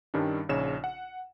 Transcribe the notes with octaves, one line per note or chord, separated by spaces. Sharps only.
G2 D#3 G3 C#4 D4
A#1 C#3 D#4 C#5 E7
F#5